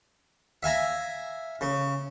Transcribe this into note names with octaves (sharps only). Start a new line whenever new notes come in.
E5 F5 G#5 A#5
C#3